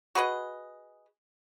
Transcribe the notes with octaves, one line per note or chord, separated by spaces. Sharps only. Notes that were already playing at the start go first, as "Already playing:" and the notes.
F#4 G#4 B4 D#5